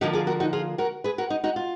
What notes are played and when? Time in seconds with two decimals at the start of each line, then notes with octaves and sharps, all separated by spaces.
0.01 D3 F3 A#3 D#4 F#4
0.13 F4 G#4
0.27 F#4 A#4
0.40 D#4 F#4
0.53 F4 G#4
0.78 F#4 A#4
1.04 G#4 B4
1.18 F#4 A#4
1.30 D#4
1.44 D#4 F#4
1.56 F4